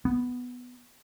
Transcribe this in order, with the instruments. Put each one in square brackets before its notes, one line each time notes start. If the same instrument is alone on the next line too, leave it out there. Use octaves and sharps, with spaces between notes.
[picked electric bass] B3